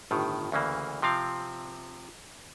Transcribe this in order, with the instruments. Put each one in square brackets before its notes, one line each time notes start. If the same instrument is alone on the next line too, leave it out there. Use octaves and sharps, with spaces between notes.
[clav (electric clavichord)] G1 A2 D#3
D2 C#3 E3 A#3
C3 F3 C4 F5